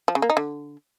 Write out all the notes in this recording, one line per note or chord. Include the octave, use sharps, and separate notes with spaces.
F3
C#3
A#3
D#4
D3